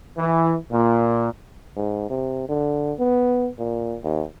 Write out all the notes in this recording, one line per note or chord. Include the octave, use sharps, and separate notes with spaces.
E3
A#2
G#2
C3
D3
B3
A#2
D#2